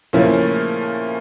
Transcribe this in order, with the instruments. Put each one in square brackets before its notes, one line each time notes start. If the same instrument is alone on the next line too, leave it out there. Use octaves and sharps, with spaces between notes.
[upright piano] A#2 [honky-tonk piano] C#3 F3 A3 C#4 E4